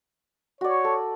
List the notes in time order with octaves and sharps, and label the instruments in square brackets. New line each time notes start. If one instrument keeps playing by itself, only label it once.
[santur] F#4 D5 [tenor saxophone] C#5
[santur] A4